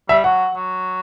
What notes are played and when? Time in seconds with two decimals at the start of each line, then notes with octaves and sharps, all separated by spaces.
0.09 G3 E5
0.24 F#3 F#5
0.54 F#3